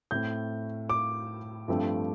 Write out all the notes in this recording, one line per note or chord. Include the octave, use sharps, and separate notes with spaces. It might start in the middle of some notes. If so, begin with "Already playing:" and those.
A2 A3 C4 G6
D6
G2 F3 A3 C4